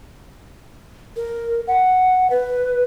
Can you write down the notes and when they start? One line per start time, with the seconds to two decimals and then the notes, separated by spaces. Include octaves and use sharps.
1.16 A#4
1.67 F#5
2.30 B4